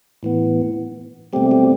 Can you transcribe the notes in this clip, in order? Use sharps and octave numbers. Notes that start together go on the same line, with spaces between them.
A2 E3 B3
B2 G3 A3 C4 G4
G3 G4